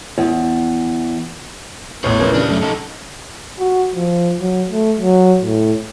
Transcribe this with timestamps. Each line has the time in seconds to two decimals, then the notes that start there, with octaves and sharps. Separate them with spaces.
0.18 E2
2.04 A1 E2 B4 C#5
2.19 A#2 C#3 E3
2.34 C#3 G3 D4
2.49 F#2 A3
2.62 D#4 A4
3.59 F#4
3.96 F3
4.40 F#3
4.68 A3
4.99 F#3
5.41 A2